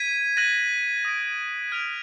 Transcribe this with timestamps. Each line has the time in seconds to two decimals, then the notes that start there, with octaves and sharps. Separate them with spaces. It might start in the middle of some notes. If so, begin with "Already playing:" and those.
Already playing: G#6 B6 D#7
0.37 F#6 A#6 D#7 F#7
1.05 D#6 A#6 D7
1.72 F6 G#6 D7 F7